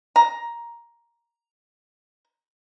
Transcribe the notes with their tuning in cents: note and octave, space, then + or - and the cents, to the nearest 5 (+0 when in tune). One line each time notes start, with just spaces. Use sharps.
A#5 +10